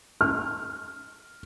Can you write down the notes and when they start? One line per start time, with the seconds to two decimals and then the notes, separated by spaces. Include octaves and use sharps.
0.21 F6